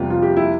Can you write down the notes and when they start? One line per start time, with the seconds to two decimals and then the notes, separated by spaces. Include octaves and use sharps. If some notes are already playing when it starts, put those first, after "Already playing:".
Already playing: F2 C3 G3 B3 F4
0.10 F4
0.22 G4
0.37 E4